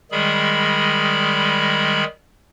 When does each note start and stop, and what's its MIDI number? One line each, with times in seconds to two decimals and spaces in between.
0.12 2.04 51
0.12 2.04 55
0.12 2.04 56
0.12 2.04 68
0.12 2.04 83